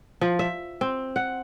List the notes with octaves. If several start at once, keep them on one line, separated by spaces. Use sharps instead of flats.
F3
E5
C4
F#5